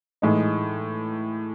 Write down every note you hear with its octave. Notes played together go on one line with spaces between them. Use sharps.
A2 E3 G#3 D#4